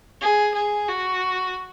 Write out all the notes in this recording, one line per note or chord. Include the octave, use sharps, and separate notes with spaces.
G#4
G#4
F#4